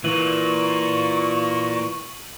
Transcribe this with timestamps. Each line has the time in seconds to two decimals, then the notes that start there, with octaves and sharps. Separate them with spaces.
0.04 A#2 E3 C#6 D#7 F#7